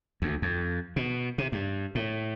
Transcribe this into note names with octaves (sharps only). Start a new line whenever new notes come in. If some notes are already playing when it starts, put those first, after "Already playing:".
D2
F2
B2
C3
G2
A2